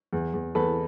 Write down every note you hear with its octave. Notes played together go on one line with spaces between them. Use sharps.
E2
E2
E2 A4 B4